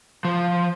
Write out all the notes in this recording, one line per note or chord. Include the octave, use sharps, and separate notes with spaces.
F3